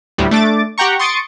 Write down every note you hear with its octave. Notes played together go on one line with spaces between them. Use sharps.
D2 A2 G3
A3 D4 D6 A6
G4 F#5 G5 A#5 C#6
C6 C#6 D#6 A6 C#7 D7